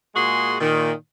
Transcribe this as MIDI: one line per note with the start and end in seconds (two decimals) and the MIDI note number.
0.15 0.56 46
0.15 0.56 56
0.15 0.56 58
0.15 0.56 66
0.15 0.56 68
0.15 0.56 84
0.60 0.91 46
0.60 0.91 51